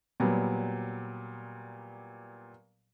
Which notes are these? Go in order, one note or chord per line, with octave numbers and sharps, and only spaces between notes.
A#2 F#3 G3 B3